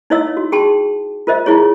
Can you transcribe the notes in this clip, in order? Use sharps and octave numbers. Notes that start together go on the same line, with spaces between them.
D#4 E4 C#5 D#5 F5 E6
F#4
G#4 G5 A5 C6
F4 A#4 C5 D#5 E5
E4 F4 G#4 C#5